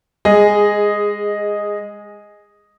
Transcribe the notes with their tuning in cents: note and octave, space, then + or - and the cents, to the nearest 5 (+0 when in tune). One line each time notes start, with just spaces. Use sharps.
G#3 -20 G#4 +0 D#5 +0